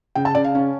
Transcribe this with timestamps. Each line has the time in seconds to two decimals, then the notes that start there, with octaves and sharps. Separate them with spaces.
0.15 C#3 G5
0.25 A5
0.35 C#3 D5
0.44 F5
0.55 C#4